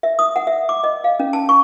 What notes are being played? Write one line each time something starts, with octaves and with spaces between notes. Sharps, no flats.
E5
D#6
F#5
E5
D6
D#5
F5
C#4
A5
C#6